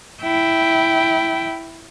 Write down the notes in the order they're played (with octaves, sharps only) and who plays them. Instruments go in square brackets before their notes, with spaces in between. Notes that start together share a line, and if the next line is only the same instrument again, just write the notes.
[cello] E4 G5